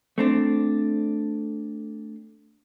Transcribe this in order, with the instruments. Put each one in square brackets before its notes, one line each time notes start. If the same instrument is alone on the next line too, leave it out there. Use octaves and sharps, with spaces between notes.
[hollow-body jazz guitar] A3 C4 D4